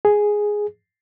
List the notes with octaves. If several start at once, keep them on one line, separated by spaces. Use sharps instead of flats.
G#4